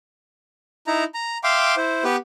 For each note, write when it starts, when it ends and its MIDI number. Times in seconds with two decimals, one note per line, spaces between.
0.87 1.04 63
0.87 1.04 64
0.87 1.04 82
1.14 1.38 82
1.44 1.75 76
1.44 1.75 77
1.44 1.75 79
1.44 1.75 84
1.44 1.75 86
1.77 2.04 64
1.77 2.04 72
2.04 2.16 59
2.04 2.16 67
2.04 2.16 71